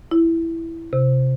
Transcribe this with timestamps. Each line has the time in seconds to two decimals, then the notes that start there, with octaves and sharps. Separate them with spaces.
0.11 E4
0.93 C3